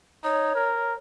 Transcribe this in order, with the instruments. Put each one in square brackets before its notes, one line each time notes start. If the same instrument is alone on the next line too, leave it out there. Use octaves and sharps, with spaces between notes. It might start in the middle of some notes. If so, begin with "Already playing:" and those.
[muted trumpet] D#4 [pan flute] C#5
[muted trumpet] A#4